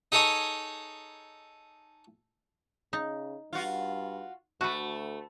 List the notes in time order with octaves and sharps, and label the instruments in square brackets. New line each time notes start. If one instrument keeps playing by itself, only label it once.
[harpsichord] D#4 G#4 A4 C#5 D#5
[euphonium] C#3 [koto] D#4
[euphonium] G2 [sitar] F4 F#4
[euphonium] D2 [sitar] A3 [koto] F#4 B4